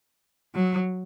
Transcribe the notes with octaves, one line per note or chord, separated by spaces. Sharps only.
F#3